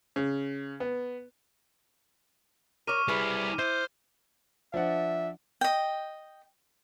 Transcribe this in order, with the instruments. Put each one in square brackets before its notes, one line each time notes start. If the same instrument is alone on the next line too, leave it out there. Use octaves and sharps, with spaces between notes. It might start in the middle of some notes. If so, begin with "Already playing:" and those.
[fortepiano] C#3
B3
[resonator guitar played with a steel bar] A#4 C#5 [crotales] D6 F6 D#7
[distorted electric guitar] G3 E4 [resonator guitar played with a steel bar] G#4 B4
[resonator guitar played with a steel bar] E4 [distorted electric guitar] C5 [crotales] G6
[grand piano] F3 D4 F#5 [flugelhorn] E5
[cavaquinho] D#5 G5